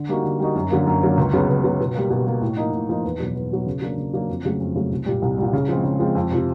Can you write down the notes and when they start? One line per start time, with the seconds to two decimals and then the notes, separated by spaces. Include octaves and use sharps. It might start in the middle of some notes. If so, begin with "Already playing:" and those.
Already playing: D3
0.09 G3 A#3 D#4 F#4
0.24 D3
0.40 G3 A#3 D#4 F#4
0.55 F#2
0.70 D3 F#3 A#3
0.86 F#2
1.02 D3 F#3 A#3
1.17 C#2
1.33 C#3 F#3 B3
1.49 C#2
1.64 C#3 F#3 B3
1.80 B2
1.95 G3 A#3
2.10 B2
2.26 G3 A#3
2.41 A2
2.57 F3 A#3 D#4
2.73 A2
2.89 F3 A#3 D#4
3.04 E2
3.19 B2 F#3 B3
3.35 E2
3.51 B2 F#3 B3
3.67 C#3
3.81 F#3 A#3 D4
3.97 C#3
4.13 F#3 A#3 D4
4.28 F2
4.45 C#3 F#3 A3
4.60 F2
4.75 C#3 F#3 A3
4.91 C2
5.06 A#2 G3
5.22 C2
5.38 A#2 G3
5.53 C#3
5.69 F3 G#3 C4
5.84 C#3
6.00 F3 G#3 C4
6.15 F2
6.31 C3 F3